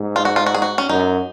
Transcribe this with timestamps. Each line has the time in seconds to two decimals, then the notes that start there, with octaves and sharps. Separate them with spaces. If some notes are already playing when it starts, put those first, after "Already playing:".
Already playing: G#2
0.16 F4
0.25 F#4
0.36 F4
0.46 F#4
0.54 G#4
0.62 F#4
0.78 C#4
0.89 F#2 D#4